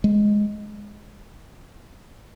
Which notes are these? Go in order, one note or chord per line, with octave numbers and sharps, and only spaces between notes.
G#3